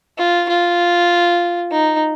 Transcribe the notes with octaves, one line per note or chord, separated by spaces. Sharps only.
F4
F4
D#4